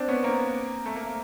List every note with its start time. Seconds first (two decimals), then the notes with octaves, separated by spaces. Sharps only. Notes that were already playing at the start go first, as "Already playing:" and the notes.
Already playing: C4 D4
0.08 B3 C#4
0.23 A#3 C4
0.86 A3
0.96 A#3
1.06 A#3